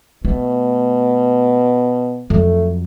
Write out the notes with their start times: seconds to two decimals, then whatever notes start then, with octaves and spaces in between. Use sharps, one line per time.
0.25 B2 A3
2.30 F2 F#3 A3